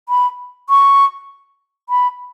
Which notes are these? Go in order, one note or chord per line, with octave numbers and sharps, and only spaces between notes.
B5
C#6
B5